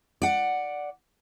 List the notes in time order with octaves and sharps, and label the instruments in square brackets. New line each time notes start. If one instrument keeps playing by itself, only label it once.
[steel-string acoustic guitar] D5 F#5